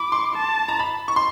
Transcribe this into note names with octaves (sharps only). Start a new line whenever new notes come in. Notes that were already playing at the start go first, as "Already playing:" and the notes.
Already playing: B5 D6
C6
A5
A#5
B5
C#6
C6